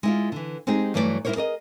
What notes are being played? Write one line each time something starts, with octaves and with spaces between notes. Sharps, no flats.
G#3 E4 F4
D3 E3
G#3 C4 D#4 G4 G#4
G2 E3 F#3 A3 B4 D5
G3 E4 G4 A#4 C5 C#5
G#4 A#4 D5 D#5